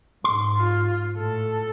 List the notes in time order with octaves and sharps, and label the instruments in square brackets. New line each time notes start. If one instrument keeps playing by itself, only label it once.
[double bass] G#2 [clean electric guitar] C6
[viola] F4
[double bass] A2 [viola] A4